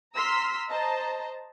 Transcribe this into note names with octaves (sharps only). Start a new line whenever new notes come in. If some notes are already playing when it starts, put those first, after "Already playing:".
A#5 C6 E6 F6 B6
C5 D#5 A5 A#5